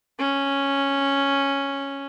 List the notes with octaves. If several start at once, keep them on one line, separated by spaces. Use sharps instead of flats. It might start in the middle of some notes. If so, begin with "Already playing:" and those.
C#4